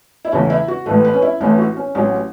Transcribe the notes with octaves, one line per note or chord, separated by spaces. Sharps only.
E4
E2 C#3 E3 A3 C#4
E4
F#4
A1 A2 E3 A3 B4
B4
C#4
E4
A1 A2 E3 A3 C#4
F#4
C#4
A1 A2 F#3 C#4